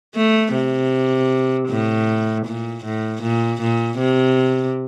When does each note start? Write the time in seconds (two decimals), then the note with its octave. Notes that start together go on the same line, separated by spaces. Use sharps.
0.16 A3
0.53 C3
1.69 A2
2.46 A#2
2.84 A2
3.22 A#2
3.61 A#2
3.99 C3